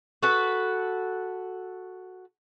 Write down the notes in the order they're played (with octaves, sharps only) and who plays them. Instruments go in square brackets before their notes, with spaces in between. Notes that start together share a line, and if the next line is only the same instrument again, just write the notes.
[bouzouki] F#4 A4 B4